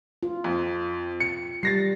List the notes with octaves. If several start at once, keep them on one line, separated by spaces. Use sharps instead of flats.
F4
F2
C#7
G3 A6 A#6 C7